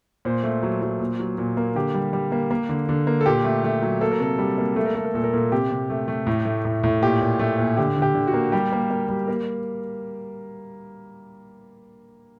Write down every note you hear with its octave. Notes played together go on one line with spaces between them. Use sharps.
A#2 C5
A3
F#3
F#3
A#2
F#3
A#2
A#3
D3 G4
G3
G3
A#3
A#3
D3
D3
A#3
A4
A#2 G4
A3
A3
F#3
A#3 A4
A#4
C3 A4
G3
A#3
A3 A4
A#4
A3 A4
A#4
A#2 A4
A#4
A#2 A4
C3 G4
C3
A3
A3
A2
A3
A2
A2
A#2 G4
A#2
A3
A#2
D3 G4
D3
G4
D3
F#4
A#3
G3 G4
A#3
A#3
G3
A#3 A#4